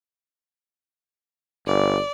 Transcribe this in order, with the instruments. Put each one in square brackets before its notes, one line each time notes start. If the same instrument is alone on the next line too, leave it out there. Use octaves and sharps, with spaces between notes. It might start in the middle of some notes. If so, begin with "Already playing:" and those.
[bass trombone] G1 [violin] D5